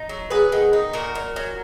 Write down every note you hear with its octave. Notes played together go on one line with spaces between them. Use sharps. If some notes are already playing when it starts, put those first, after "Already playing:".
Already playing: D#4
F#3
B3 G#4 B4
D#3
D#4
A#2 F#4 A#4
A#2
F#3